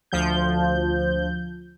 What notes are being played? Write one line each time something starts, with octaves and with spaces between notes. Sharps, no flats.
D2 F3 G6